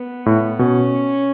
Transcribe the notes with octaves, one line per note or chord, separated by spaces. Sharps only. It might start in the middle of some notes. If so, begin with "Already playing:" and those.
Already playing: B3
A2
B2 C#4